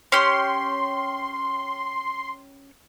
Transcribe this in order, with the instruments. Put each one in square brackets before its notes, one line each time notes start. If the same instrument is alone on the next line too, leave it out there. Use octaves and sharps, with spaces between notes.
[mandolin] C#4 G4 [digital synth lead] C6